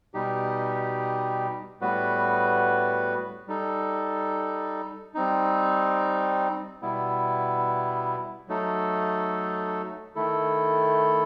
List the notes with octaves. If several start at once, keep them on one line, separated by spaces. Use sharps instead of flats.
B2 G3 D#4 G4
A2 G3 B3 F#4 B4
G3 D#4 A4
G3 C4 D#4
B2 G3 B3 E4
F#3 A3 D#4 A4
D#3 A3 E4 A4